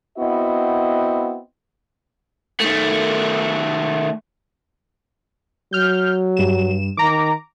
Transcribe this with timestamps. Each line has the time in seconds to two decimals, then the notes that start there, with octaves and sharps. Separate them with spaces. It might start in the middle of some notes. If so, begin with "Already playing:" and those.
0.18 B3 C4 E4 F#4 D#5
2.60 D#3 A3
5.73 F#3 F6 G6
6.37 G2 E7
6.97 D#3 A#5 D6